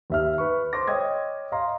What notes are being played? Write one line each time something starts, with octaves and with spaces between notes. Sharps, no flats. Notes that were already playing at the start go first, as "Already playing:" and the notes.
D#2 E5 F6
B4 C#6
C5 C6 D6 A#6
C#5 D#5 G5 D#6 G#6
D#5 F5 A#5 C6